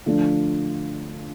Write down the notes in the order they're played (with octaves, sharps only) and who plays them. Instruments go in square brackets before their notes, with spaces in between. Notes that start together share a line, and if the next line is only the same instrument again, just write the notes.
[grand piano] D3 F3 A3 D4 F4